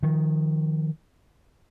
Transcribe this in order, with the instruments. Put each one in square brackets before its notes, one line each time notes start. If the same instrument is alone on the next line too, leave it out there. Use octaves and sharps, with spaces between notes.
[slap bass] D#3 F3